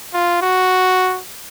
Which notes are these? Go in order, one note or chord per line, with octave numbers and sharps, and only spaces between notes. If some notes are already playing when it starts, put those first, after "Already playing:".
F4
F#4